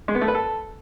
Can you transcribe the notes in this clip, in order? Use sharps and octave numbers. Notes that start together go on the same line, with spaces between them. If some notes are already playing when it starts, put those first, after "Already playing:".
G#3
B3
A3
B4
A4